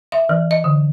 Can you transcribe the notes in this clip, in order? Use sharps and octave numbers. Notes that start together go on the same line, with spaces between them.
E5
E3
D#5
D3